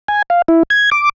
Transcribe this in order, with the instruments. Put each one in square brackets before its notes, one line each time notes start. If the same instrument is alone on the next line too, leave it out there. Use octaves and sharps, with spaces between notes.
[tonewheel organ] G#5
F5
E4
G#6
D6